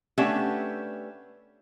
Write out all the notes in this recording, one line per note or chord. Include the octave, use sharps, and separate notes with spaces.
A3 B3 C#4 D4 G4 E5